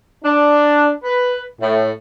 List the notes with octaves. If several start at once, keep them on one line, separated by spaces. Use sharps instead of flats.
D4
B4
A2